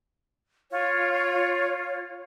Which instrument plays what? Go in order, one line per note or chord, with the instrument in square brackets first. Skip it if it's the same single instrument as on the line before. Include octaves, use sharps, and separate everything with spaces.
[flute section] F4 C#5